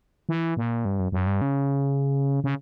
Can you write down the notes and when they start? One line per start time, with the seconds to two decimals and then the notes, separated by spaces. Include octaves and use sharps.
0.29 E3
0.57 A#2
0.85 G2
0.99 F#2
1.12 F#2
1.27 G2
1.41 C#3
2.44 C#3